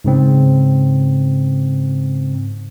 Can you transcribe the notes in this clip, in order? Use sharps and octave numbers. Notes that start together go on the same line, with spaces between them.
G#2 C#3 C4